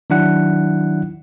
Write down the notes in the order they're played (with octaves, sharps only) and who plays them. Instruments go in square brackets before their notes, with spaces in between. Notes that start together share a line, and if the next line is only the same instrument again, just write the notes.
[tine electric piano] D#3 F#3 D4 E4 F#5